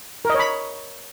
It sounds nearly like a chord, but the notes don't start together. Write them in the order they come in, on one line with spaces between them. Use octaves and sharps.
A#4 D#5 C#5 B5